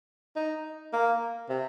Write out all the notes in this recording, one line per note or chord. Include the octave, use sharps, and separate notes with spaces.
D#4
A#3
C3